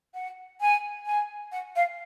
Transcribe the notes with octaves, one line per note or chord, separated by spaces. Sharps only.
F#5
G#5
G#5
F#5
F5